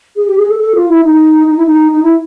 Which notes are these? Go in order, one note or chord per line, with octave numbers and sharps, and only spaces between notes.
G#4
G4
G#4
A4
A4
F4
E4
D#4
D#4
E4
D#4
D#4
E4